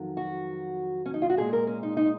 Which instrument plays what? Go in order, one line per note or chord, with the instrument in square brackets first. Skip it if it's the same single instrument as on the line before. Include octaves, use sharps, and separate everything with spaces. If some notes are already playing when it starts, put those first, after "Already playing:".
Already playing: [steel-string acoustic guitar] F2 D#3 F#3
F#4
C#4
D#4
F4
F#4
A#2 G#3 G#4
A#4
C#4
D#4
D#4